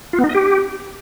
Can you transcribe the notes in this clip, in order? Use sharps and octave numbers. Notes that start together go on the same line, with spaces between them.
F4
B3
D#4
D#5
G4